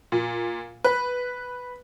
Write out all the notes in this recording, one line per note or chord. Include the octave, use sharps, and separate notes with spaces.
A#2
B4